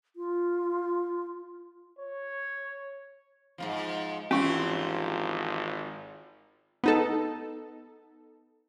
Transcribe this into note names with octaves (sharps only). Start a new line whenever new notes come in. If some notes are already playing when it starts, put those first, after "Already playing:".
F4
C#5
G#2 B2 F3
G#1 E3 F3 C4 C#4 F4 G4 C#6
B3 D#4 A4